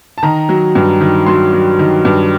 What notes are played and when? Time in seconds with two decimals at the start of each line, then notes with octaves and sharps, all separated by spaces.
0.18 A5
0.23 D#3 A#5
0.49 F#3
0.75 G2
1.01 D#3
1.26 F#3 C6
1.53 F#3
1.79 D#3
2.05 G2